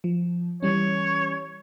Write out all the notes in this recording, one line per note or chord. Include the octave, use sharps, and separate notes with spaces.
F3
E3 G3 C#4 C#5